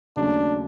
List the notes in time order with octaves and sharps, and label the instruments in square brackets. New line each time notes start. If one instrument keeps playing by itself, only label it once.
[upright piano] D#2 C#3 F#3 A3 C#4 [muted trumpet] D4